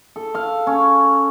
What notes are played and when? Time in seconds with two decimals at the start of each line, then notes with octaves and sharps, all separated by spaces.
0.16 A4
0.35 F5
0.67 C#4